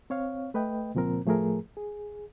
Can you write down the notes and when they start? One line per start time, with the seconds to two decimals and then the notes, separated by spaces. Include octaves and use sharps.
0.10 C4 C#5 F5
0.54 A3 B4 D#5 G5
0.95 C#2 A#2 F3 C4 A#4
1.25 A2 F3 A3 G#4 A#4
1.77 G#4